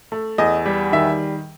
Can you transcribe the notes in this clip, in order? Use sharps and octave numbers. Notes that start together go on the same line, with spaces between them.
A3
E2 D#5
G3
D#3 E5